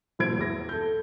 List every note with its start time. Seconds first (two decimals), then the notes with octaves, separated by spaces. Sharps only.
0.19 E1 A#2 E3 C5 G#6 D7
0.38 E2 A#6
0.69 A4 G6